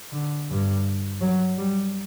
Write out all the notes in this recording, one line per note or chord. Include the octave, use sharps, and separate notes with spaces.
D3
G2
F#3
G3